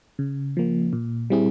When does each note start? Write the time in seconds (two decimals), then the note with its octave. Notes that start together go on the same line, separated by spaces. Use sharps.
0.19 C#3
0.57 F3 A#3
0.93 A#2
1.30 G3 C4 E4 G#4